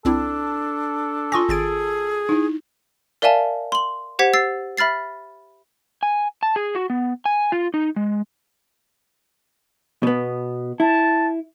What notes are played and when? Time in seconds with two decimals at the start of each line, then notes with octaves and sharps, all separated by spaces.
0.05 C2 C4 D4 E4 A4
1.32 F4 G#5 C6 C#6 A#6
1.49 G#1 G#4 A6 D7
2.29 D#4 E4
3.22 A#4 D5 E5 F5 G#5 A5
3.72 C6 F#7
4.19 G4 C5 F#5 G#6 B6
4.33 E6 A6 C7
4.77 E5 B5 F6 A6 C7
6.03 G#5
6.43 A5
6.56 G#4
6.75 F#4
6.90 B3
7.25 G#5
7.52 F4
7.74 D#4
7.96 G#3
10.03 B2 B3
10.80 E4 A5